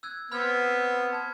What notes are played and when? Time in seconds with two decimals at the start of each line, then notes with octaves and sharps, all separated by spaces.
0.03 E6 F#6 G#6
0.32 B3 C4 B5 F6 G#6
1.13 A5 G#6